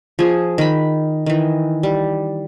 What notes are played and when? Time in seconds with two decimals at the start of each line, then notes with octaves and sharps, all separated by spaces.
0.19 F3 G#4
0.58 D#3 B5
1.26 D#3 E3
1.83 G3